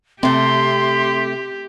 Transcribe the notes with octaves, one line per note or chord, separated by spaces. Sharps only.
C3 A3 C4 G4 C6